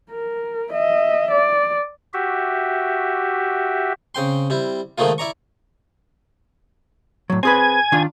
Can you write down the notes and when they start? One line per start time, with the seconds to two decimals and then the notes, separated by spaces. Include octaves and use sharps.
0.10 A#4
0.71 D#5 E5
1.31 D5
2.14 F#4 G4 E5
4.15 C#3 C4 G5 C6
4.50 G3 C4 E4
4.98 G#2 D#3 F3 A3 A#3 F4
5.18 E4 D5 A#5 C#6
7.30 A2 F#3
7.43 C4 G#4 B4 G#5
7.92 D#3 D4 F4